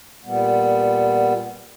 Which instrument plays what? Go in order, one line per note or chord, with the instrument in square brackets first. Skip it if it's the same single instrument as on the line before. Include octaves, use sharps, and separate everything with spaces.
[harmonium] A#2 G3 B3